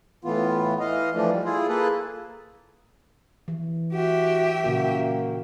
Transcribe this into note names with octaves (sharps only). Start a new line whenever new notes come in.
A2 E3 B3 F4
E3 D#5 F5
E3 F3 A3 D4
G3
E4 F4 G#4
A#3 G#4 A4 B4
E3
F#4 G4 E5
A#2 C#3 A#3 F#4